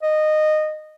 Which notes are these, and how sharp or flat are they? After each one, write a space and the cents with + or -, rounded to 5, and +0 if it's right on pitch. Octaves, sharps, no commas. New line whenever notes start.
D#5 -15